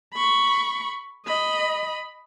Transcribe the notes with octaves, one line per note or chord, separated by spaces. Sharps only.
B5 C#6
D#5 B5